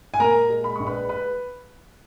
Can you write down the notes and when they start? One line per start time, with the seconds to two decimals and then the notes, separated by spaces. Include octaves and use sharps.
0.14 G#5
0.20 A#2 A#4 A#5
0.50 G#3
0.64 B5
0.76 A#1 C#6
0.87 B4 B5
1.09 B4 B5